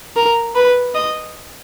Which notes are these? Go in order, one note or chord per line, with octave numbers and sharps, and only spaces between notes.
A#4
B4
D#5